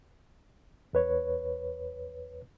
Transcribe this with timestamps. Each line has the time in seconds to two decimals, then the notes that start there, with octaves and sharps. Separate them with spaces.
0.93 E2 B4 C#5